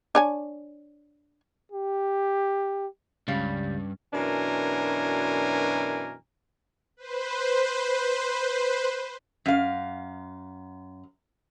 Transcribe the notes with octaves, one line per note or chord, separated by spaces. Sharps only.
D4 C#5 G#5
G4
C#2 G2 G3 C#4 F5
F#2 B2 E3 D4 A#4 G#5
B4 C5
F#2 F5